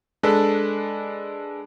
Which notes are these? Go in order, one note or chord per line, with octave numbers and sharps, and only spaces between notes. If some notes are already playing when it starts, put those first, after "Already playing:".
G#3 D4 A4 B4